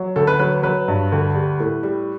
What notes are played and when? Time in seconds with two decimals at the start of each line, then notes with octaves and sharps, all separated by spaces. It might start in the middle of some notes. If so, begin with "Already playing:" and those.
Already playing: F#3
0.16 D2 A4
0.27 B4
0.39 F#3 B4
0.63 F#3 B4
0.88 G2
1.12 D2
1.35 G3
1.60 A2
1.83 G3